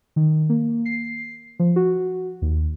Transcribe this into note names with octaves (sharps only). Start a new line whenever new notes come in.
D#3
A#3
C7
F3
F#4
D#2